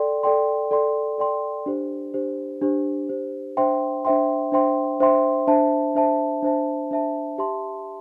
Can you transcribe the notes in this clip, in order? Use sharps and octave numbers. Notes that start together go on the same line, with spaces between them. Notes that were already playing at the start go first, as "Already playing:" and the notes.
Already playing: A4 D5 G5 C6
A4 D5 G5 C6
A4 D5 G5 C6
A4 D5 G5 C6
D4 G4 C5
D4 G4 C5
D4 G4 C5
D4 G4 C5
D4 C5 E5 G5 C6
D4 C5 E5 G5 C6
D4 C5 E5 G5 C6
D4 C5 E5 G5 C6
D4 C5 E5 A5
D4 C5 E5 A5
D4 C5 E5 A5
D4 C5 E5 A5
G4 E5 A5 C6